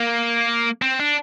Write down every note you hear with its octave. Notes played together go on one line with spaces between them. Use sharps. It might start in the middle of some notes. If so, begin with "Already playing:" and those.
Already playing: A#3
C4
D4